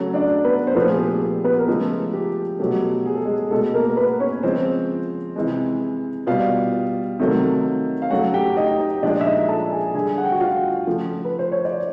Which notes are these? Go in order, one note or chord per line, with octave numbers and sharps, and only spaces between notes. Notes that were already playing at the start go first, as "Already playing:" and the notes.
Already playing: C#3 F#3 A3
D4 D5
B3 B4
C5
A#2 F3 A3 B3 B4
G#4
G4
B3 B4
A#4
C#3 F3 G#3 A3 A4
G4
B2 F#3 A3 G4
G#4
A4
G#3 G#4
B2 G#3 A3 A4
A#3 A#4
A#4
B3 B4
C#4 C#5
C#3 F3 G#3 C4 C5
C3 E3 G#3
B2 G3 F4 F5
C3 D#3 F#3 A3
F5
C#3 F#3 A3 F#4 F#5
G4 G5
D#4 D#5
D#4 D#5
A#2 F3 G#3 D4 D5
E5
D#4 D#5
A4 A5
G#4 G#5
D3 G3 G#4 G#5
F#5
G5
F#4 F#5
F4 F5
C#3 F3 A3
B4
C5
C#5
D5